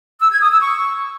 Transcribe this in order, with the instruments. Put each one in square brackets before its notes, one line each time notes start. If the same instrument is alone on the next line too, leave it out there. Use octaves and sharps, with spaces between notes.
[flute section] E6
G#6
D#6
E6
C#6